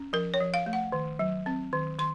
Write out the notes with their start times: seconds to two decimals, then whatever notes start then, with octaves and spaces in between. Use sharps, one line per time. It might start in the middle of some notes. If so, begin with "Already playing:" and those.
Already playing: C#4
0.13 F3 A#4
0.34 C#5
0.40 F3
0.54 F5
0.66 A3
0.73 F#5
0.92 D#3
1.19 F#3
1.46 C4
1.73 D#3
1.99 D#3 C6